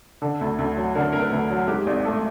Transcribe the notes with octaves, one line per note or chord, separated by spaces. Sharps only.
D3 A4
D2
D2
F#3
D3 A#4
D2 A#4
B4
D2
F#3
G#2 G4
G#1
A3